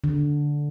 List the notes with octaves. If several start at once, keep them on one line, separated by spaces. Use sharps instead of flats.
D3